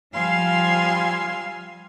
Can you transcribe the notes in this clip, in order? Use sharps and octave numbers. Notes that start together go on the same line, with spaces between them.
F3 G3 F5 G#5 C6 E6